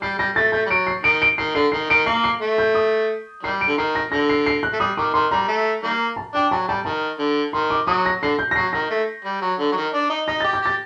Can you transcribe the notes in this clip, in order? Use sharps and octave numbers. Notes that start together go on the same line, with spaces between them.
G3 C7
G3 A#6
A3 A6
A3 G6
G3
F#3 D7
C7
D#3 D7
D7
D#3 C7
D3 C7
D#3 C7
D#3 D7
A#3 C7
C7
A3
G6
D#6
D#3 G3 C7
D7
D3
D#3 C7
A#6
D3 A#6
C7
C7
F#6
A3
G3 D#6
D#3 D6
D#3 C6
G3 A#5
A3
D#3 G3 A#3
A5
D4 G5
F#3 A5
G3 A5
D#3 A5
D3
D#3 C6
D6
F#3 D#6
A#6
D3 C7
G6
A#6
F#3 C7
D#3 A#6
A3
G3
F#3
D3
F#3
D#3
D4
D#4
D#4 A#6
G4 A6
G6
G4 A6